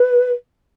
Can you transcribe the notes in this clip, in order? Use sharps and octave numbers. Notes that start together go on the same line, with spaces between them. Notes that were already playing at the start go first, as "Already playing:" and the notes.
Already playing: B4